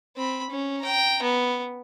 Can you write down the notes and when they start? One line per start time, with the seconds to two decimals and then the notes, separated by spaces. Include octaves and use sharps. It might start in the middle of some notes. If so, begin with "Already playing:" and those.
0.16 C4 B5
0.50 C#4
0.80 G5 A#5
1.22 B3